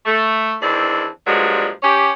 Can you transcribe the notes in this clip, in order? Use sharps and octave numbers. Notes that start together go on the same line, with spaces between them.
A3
E2 D#3 C4 D4 E4
G2 A#2 F3 F#3 G#3
C#4 G4